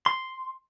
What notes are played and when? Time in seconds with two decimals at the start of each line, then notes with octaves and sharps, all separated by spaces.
0.06 C6